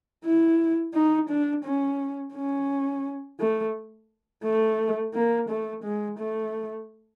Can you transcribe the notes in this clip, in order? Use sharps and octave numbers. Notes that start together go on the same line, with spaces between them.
E4
D#4
D4
C#4
C#4
A3
A3
A#3
A3
G#3
A3